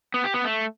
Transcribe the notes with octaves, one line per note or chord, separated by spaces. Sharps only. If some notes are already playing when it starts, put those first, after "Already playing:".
B3
G4
B3
A3